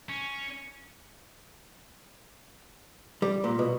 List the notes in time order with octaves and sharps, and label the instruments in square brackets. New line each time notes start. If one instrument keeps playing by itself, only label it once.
[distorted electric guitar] C#4
[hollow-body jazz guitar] G3
A#2
B2